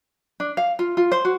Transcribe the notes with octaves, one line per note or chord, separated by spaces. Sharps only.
D4
F5
F4
F4
C5
F#4